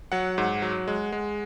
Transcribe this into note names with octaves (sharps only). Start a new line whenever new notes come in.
F#3 F#5
G#2
F#3
G#3
G#3